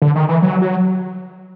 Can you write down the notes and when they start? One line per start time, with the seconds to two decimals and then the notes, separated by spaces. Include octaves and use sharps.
0.02 D3
0.15 D#3
0.28 E3
0.42 F#3
0.62 F#3